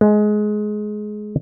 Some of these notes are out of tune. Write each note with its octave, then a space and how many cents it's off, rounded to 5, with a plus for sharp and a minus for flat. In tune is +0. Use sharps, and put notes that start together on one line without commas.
G#3 +20